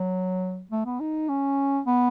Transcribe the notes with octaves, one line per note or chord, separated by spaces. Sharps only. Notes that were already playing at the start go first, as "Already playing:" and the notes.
Already playing: F#3
A3
B3
D#4
C#4
B3